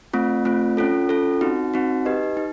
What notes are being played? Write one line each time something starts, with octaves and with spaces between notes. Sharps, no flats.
A3 C4 F4
A3 C4 F4
C#4 F4 A4
C#4 F4 A4
C4 D#4 F#4
C4 D#4 F#4
D#4 G4 B4 D#5
D#4